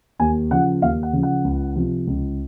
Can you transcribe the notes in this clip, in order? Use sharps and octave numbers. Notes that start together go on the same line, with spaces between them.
D#2 G#5
C#3 F3 F#5
D#2 F5
F#5
C#3 F3
F#5
C#2
C3 F3
C#2